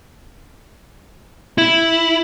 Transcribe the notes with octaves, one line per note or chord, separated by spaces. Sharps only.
E4